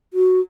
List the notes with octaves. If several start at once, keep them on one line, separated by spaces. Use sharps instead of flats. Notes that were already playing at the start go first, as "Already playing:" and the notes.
F#4